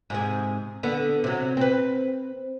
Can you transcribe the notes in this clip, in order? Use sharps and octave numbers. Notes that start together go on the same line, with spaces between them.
G#2 C3 G#4
D3 B3
C3 F#3
C4 B4